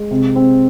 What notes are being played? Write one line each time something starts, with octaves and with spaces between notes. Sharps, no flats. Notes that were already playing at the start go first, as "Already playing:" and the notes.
Already playing: G#3
C3
C4